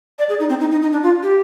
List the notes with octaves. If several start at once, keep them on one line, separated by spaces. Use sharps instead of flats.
D5
G#4
D#4
C4
D#4
D#4
D#4
D4
F4
G4